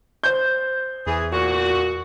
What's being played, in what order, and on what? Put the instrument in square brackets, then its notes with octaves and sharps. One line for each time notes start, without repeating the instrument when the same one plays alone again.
[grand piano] C5 G6
[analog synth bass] E2 [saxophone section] E3 G#4
[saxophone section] A#2 F#4